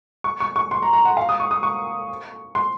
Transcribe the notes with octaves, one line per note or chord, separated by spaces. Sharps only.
C#6
C#6
C#6
C6
A#5
A#5
F#5
F5
D#6
C#6
D#6
C#6
C6